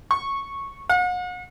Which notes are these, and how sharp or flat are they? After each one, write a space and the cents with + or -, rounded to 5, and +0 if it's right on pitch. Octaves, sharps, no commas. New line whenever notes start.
C#6 -10
F#5 -40